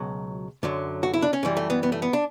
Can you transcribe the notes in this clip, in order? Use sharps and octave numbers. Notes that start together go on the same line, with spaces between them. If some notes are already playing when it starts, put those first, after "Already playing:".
Already playing: C#2 B2 F#3
F#2 D3 F#3
F#4
E4
D4
C#4
F#2 E3 G3
A3
B3
B3
A3
B3
D4